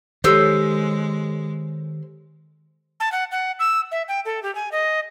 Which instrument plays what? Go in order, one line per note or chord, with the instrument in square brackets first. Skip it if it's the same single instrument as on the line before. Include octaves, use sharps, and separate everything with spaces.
[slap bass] D#3 [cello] G#3 [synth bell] G4 A4 C#5 [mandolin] C5 E6
[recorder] A5
F#5
F#5
E6
E5
G5
A4
G4
G#5
D#5